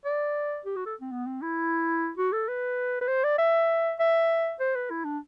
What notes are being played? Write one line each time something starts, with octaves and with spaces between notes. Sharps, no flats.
D5
G4
F#4
A4
C4
B3
C4
E4
F#4
A4
B4
B4
C5
D5
E5
E5
C5
B4
E4
D4